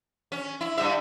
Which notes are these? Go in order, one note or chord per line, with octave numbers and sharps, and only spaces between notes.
C#4
E4
G2 G3 E5